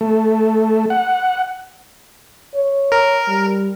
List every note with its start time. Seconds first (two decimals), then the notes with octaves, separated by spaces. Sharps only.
0.01 A3
0.90 F#5
2.55 C#5
2.92 A#4
3.28 G3